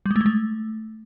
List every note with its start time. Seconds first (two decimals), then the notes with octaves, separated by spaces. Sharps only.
0.06 G3
0.11 G#3
0.16 A3
0.21 G#3
0.26 A3